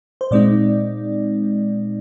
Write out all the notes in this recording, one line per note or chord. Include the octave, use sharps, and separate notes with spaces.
C5
A#2 G#3 C4 D#4 D5